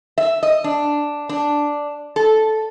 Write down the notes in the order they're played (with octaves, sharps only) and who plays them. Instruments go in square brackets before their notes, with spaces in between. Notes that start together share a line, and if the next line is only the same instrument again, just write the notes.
[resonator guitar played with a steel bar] E5
D#5
D4
D4
A4